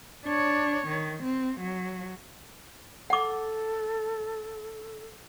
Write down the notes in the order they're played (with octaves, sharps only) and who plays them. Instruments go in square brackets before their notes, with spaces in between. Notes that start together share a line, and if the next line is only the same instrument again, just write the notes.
[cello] D4 C#5
D#3
C4
F#3
[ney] A4 [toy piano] F#5 D6